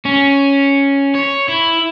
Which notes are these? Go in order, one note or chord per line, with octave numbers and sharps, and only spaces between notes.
C#4
C#5
E4